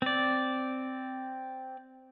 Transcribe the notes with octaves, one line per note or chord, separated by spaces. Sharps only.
C4 D5